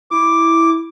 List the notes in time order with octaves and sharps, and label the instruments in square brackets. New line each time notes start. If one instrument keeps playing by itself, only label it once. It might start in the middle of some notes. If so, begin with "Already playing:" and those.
[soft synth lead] E4 [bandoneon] D6